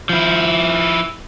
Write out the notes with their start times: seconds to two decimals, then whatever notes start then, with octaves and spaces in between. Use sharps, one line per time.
0.09 F3 E4